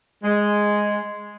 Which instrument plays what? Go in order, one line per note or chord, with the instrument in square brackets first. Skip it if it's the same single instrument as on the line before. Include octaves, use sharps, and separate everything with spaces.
[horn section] G#3